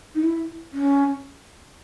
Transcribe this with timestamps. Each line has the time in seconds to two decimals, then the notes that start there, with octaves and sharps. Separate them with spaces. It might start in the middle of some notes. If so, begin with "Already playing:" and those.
0.15 D#4
0.23 E4
0.73 C#4